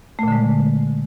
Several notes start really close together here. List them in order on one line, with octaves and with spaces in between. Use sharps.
A3 A#2 D3 G#3